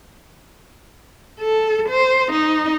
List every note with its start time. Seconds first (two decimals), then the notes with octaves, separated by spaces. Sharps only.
1.40 A4
1.89 C5
2.32 D#4